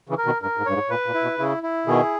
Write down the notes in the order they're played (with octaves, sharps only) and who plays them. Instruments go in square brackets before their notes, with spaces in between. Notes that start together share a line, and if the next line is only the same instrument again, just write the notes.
[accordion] C#3 E3
[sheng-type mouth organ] A#4
[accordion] B2 D#3
[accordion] G2 [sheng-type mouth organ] A#4
[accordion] G#2
[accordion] G2 [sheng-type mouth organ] C#5
[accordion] G#2
[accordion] A#2 [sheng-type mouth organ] B4
[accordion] A#2
[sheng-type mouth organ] E4
[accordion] B2
[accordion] C#3 [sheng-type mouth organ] E4
[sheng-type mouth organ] E4
[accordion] B2 D#3 [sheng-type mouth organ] G#4